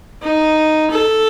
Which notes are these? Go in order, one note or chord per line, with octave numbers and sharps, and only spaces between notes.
D#4
A4